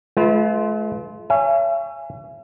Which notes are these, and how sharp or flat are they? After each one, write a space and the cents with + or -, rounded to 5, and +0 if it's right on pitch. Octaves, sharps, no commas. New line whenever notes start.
A3 -45 F4 +0 B4 +0
C#5 +15 E5 +40 G#5 -5